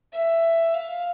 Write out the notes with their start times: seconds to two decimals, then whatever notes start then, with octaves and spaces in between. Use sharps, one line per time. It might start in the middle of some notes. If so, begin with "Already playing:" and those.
0.13 E5
0.74 F5